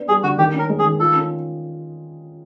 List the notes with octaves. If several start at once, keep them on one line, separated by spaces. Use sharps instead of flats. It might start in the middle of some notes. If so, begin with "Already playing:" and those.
Already playing: B3 D4
G3 G#4
D3 F#4
D#3 G4
C#4 A#4
G#3
G#4
D#3
F4 A4
C#4